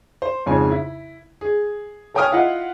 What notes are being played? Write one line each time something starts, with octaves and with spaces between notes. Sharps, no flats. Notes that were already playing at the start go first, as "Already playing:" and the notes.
C5
F2 G#2 C#3 G#5
E4
G#4
A4 C#5 G5 G#5 D#6 F6
E4 F4 D#5 F#5